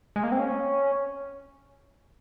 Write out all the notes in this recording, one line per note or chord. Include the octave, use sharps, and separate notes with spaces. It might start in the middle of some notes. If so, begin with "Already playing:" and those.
G#3
A#3
C4
C#4